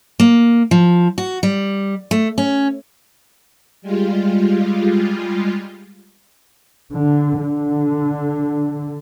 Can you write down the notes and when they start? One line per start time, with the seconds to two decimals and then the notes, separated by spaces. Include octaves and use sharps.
0.20 A#3
0.71 F3
1.18 F#4
1.43 G3
2.11 A3
2.38 C#4
3.82 G3 G#3 F4
6.94 D3
7.41 D3